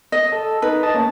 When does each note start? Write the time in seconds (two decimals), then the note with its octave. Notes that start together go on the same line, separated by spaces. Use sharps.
0.12 D#5
0.32 A4
0.62 D#4 B4
0.83 D#5 A5
0.94 A#3 C#4